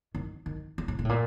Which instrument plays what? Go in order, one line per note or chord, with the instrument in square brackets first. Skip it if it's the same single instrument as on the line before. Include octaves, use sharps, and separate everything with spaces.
[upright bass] D#3
D#3
D3
C3
A#2
A2
A#2